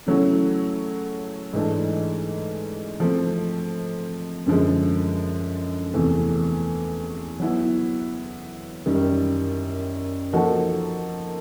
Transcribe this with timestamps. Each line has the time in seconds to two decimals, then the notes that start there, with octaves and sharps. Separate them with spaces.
0.06 C#3 F#3 A3 C#4 E4
1.53 G#2 E3 A3 D4
3.00 F3 A3 C4
4.46 F#2 D3 F3 G#3
5.94 E2 C3 E3 A3
7.40 F#3 B3 E4
8.86 F#2 D#3 G3
10.33 F3 A#3 D#4 F#4 A4